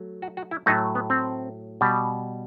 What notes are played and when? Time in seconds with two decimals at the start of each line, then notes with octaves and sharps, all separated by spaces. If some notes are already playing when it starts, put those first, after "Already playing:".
Already playing: F#3 A3
0.22 F#4
0.37 F#4
0.51 E4
0.66 A2 F#3 A3 D#4
0.95 B3
1.10 C4
1.81 B2 G3